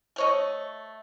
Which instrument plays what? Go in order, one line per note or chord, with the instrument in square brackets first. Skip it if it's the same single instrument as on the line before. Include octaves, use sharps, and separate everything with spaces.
[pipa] A3 C#5 D#5